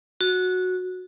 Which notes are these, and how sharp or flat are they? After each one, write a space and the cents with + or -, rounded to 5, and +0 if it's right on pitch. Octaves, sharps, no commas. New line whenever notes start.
F#4 -10